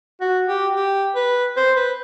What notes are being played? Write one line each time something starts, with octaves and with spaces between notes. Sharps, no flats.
F#4
G4
G4
B4
C5
B4